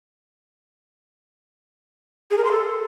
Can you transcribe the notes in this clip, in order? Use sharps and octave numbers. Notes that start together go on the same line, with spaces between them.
G#4
A#4
C6
A4